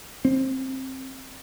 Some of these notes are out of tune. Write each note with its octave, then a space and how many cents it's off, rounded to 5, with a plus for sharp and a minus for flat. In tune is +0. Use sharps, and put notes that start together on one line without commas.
C4 +15